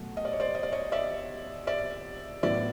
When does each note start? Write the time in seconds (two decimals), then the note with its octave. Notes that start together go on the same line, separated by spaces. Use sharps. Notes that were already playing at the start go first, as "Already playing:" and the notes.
Already playing: B2 F#3 A3
0.17 D#5
0.25 D5
0.33 C#5
0.40 C5 D5
0.55 D#5
0.63 D5
0.72 C#5 D#5
0.92 D5 E5
1.67 D5 E5
2.43 A2 F#3 B3 E4 D5 E5